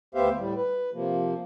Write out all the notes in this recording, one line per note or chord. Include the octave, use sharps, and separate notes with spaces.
D2 B3 G4 C5 E5 F5
A2 G3
B4
C3 F3 A#3